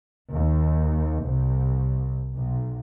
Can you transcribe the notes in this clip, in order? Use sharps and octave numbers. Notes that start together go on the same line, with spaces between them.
D#2
C2
B1